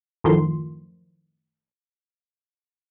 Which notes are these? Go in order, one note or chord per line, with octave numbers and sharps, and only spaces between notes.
F#2 A2 D#3 F3 C6